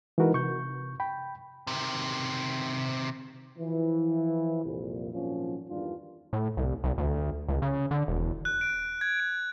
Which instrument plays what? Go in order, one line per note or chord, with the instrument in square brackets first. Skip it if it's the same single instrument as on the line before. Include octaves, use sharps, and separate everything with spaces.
[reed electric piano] E3 G#3 D#4 F#4 A#4 B4
C3 C#6 G6
G5 B5
[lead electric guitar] C3 D#3
[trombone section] E3 F3
C2 F2 A#2
G#1 A#2 F3 F#3 C#4 F4
E2 G2 D#3 G3 D4 F4
[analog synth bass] A2
C2
C2
D2
C#2
C#3
D3
E1
[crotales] F#6
D7
G#6
D7